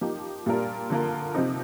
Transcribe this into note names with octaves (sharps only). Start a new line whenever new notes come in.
F3 A#3 D#4 G4
A#2 G3 D4 F4 A#4
D3 F3 A#3 F4 A#4
C3 F3 C4 D#4